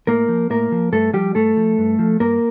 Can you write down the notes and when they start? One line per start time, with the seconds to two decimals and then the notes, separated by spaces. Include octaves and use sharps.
0.07 A2 A#3 A#4
0.29 F3
0.50 A2 A#3 A#4
0.72 F3
0.92 G2 A3 A4
1.14 F3 G3 G4
1.35 G2 A3 A4
1.57 F3
1.78 G2
1.99 F3
2.20 G2 A#3 A#4